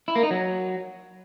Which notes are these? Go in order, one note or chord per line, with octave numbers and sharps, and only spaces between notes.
E4
A#3
D#4
F#3